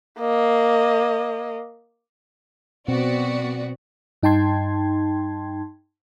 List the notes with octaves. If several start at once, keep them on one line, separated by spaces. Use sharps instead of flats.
A#3 D#5
B2 B3 C4 F#4 D5
G2 D#4 G5 A5 C6 G#6